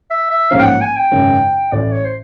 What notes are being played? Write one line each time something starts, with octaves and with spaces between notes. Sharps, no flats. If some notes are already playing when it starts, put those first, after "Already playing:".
E5
E5
A1 G#2 F3 A#3 C#4 F5
G5
F#5
G#5
G5
G#1 F#2 C#3
A1 A2 E3 D5
C#5
C5